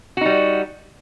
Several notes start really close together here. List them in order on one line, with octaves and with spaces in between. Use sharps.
F#4 D#4 G3